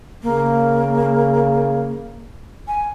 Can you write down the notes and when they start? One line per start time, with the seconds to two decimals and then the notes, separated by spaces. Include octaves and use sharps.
0.23 C#3 A#3
2.68 G#5